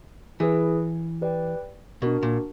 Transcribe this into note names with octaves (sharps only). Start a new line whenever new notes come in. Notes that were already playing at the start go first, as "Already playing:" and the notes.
E3 E4 G#4 B4
G4 B4 D5 G5
B2 D4 F#4 A#4
A#2